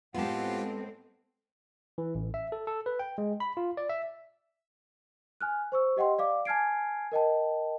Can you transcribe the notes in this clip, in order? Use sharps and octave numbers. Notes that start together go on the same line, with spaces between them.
A2 G#3 B3 C4 F4 G4 A4 F#5
E3
A1
E5
A4
A4
B4
G5
G#3
B5
F4
D5
E5
G#5 F6 F#6
C5 C#6 E6
G4 D#5 F#5 G5 C6
D5 F5 D6
G#5 A5 F6 G#6 C7 D7
A#4 D#5 G5 A5